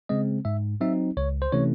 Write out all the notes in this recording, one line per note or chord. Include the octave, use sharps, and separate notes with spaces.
C#3 G#3 C4 D#5
G#2 E5
F#3 C4 D#4 E5
C#2 C#5
C5
C3 E3 A3 C#4 C#5